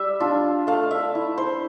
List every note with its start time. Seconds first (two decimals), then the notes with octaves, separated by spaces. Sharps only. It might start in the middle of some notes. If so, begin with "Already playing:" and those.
Already playing: G3 E5
0.20 D4 F4
0.67 A3 F5
0.91 E5
1.15 E4
1.38 C5